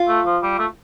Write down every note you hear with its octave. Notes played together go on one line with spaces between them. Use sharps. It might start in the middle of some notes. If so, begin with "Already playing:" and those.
Already playing: F4
A3
F3
G3
A3